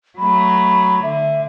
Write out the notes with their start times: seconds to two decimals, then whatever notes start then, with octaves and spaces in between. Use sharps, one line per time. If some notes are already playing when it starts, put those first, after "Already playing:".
0.18 F#3 A3 B5
1.03 D3 E5